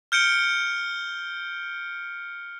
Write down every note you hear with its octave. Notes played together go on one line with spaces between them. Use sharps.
F6 G6 C#7 D7 G7